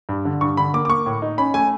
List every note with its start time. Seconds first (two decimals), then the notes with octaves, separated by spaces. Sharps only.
0.09 G2
0.25 D3
0.41 G2 C#6
0.57 D3 B5
0.74 A#3 D6
0.85 D6
0.89 A#3 C#6
1.06 A2
1.22 D#4
1.38 C#4 B5
1.54 A3 G#5